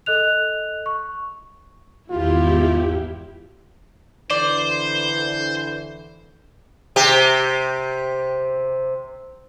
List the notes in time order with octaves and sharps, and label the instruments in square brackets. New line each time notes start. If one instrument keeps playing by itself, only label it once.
[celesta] A4 D#5 F#6 F7
C#6
[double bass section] G#1 E2 [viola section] E4 G4 [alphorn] F4
[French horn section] D3 E3 [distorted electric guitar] C5 [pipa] D5
[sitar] C3 G4